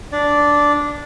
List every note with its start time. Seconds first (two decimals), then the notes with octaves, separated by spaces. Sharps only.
0.12 D4 D5